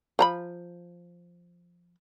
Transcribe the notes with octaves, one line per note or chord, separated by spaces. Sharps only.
F3 A#5 B5